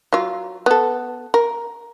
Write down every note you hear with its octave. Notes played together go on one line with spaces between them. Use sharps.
F#3 F4
B3 A4
A#4